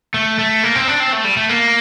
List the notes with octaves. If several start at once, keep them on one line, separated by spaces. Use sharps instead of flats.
A3
A3
A#3
C4
D4
C4
A3
G3
A3
A#3